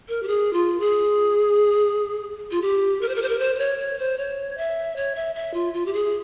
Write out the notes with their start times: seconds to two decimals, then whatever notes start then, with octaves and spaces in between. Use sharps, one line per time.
0.08 A#4
0.23 G4
0.28 G#4
0.53 F4
0.80 G#4
2.51 F4
2.62 G4
3.01 A#4
3.09 C5
3.15 A#4
3.22 C5
3.29 A#4
3.39 C5
3.55 C5
3.59 C#5
3.79 C#5
3.99 C5
4.18 C#5
4.58 E5
4.96 C#5
5.15 E5
5.35 E5
5.54 F4
5.73 F4
5.86 G4
5.94 G#4